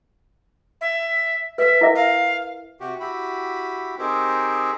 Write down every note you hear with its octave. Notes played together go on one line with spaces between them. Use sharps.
E5
B4 E5
E4 A#4 E5
F5
C3 F#4 G4
E4 F#4 G4 B5
C4 D#4 G4 G#4 A#4 C5